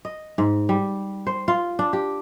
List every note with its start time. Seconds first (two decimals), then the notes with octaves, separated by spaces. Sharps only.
0.05 D#5
0.38 G#2
0.69 G3
1.27 C5
1.48 F4
1.79 D4
1.93 G4